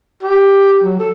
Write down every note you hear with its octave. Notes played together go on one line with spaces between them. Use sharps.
G4
F#3
A4